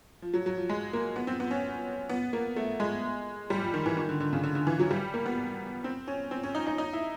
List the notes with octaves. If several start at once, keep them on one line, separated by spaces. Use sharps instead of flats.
F3
F#3
F#3
F3
G#3
A#3
B3
C4
B3
C#4
B3
A#3
A3
G#3
G3
F3
D#3
E3
D#3
D3
D3
C#3
D3
D3
E3
F#3
G3
A#3
B3
C4
C#4
C4
C#4
D#4
D#4
D#4
E4